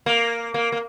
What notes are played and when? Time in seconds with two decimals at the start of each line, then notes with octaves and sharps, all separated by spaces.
0.06 A#3
0.54 A#3
0.72 A#3